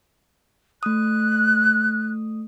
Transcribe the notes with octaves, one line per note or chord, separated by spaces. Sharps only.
A3 D#6 F#6